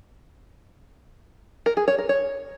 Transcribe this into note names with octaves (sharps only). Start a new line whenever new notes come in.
A#4
G#4
C#5
A#4
C#5